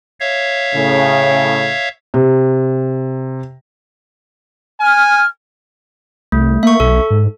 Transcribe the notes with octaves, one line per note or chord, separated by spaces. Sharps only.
C#5 E5 F5
A2 C#3
C3
G#5 F6
C2 A3
A#3 E5 C#6
B1 A4
G#2